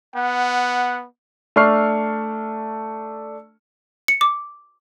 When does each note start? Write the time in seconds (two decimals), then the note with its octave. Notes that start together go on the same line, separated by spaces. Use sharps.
0.16 B3 F#5
1.56 A3 D4 A4 C#6 F6 C7
4.08 C#7
4.21 D6